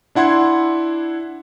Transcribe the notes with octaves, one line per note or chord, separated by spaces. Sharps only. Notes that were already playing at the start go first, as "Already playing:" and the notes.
D4 E4 F#5 C6 G#6